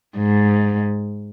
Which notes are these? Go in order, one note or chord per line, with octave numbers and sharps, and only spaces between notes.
G#2